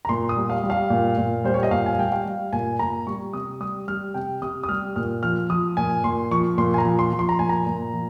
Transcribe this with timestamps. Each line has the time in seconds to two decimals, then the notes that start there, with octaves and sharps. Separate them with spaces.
0.05 A#5
0.09 A#2 C6
0.29 D#6
0.36 G3
0.50 F5
0.63 G3
0.70 F5
0.90 A#2
1.17 A#2
1.44 G3 C5
1.54 C#5
1.63 D#5
1.71 A#2 F5
1.86 G#5
1.98 G3 G5
2.12 F5
2.25 G3
2.53 A#2 G#5
2.79 A#2 A#5
3.06 G3 C#6
3.33 C3 D#6
3.60 G3 D#6
3.88 G3 F6
4.14 C3 G5
4.41 C3 D#6
4.63 D#6
4.69 G3 F6
4.96 A#2 F6
5.23 F3 F6
5.50 F3 D#6
5.77 A#2 G#5
6.04 A#2 C6
6.31 F3 C#6
6.57 A#2 C6
6.74 G#5
6.78 A#5
6.85 F3
6.99 C6
7.12 F3
7.19 C6
7.29 A#5
7.39 A#2 G#5
7.49 A#5
7.66 A#2
7.93 F3